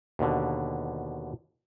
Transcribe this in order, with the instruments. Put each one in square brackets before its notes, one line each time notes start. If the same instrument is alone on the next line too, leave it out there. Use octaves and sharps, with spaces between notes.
[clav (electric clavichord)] D#2 B2 D3